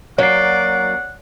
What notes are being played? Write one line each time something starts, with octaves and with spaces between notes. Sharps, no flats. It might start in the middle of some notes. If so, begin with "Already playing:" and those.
F#3 A#3 C#4 C#5 D5 F#5 C7